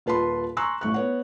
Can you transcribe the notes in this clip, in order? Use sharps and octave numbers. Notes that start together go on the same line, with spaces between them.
D#1 F4 B4 A5 B5 C6
G#5 A#5 C6 C#6 E6 F#6
A1 A3 C#6 F#6
B3 C#5 F#5